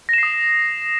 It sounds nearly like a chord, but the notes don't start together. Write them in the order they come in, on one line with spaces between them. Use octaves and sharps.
A#6 E7 C7 D#6